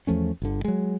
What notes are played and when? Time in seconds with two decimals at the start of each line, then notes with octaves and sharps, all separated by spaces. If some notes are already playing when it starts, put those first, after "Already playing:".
0.07 E2 F3 A3 C#4
0.42 G1 D3
0.64 F#3 G#3